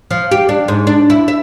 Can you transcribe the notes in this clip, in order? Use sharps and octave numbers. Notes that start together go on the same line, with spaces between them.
F3
G4
D4
G#2
D4
E4
E5